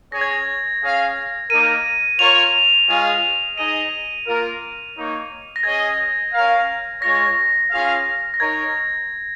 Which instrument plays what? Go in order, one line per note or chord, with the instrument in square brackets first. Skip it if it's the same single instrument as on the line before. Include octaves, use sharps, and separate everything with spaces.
[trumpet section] C#4 G#4 C#5 [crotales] A#6
[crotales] G#6
A#6
[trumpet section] C#4 G#4 F5
[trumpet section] A#3 D#4 A#4 [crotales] D#7
[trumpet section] F4 A#4 C#5 [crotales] F7
[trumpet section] G#3 F4 G#4 C#5 F5
[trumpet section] D#4 G#4 D#5 [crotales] D#7
[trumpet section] A#3 F4 A#4
A#3 D#4 C#5
[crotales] A#6
[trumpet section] C#4 G#4 D#5 [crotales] G#6
[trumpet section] C#4 A#4 F5
[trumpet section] G#3 F4 C#5 [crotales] A#6
[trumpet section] C#4 F4 G#4 F5
[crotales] A#6
[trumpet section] D#4 A#4 C#5 [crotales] G#6